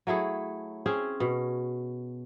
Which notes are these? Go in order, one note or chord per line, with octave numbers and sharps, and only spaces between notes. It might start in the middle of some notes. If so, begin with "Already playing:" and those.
F#3 A3 E4 G#4
C4 C#4 G#4
B2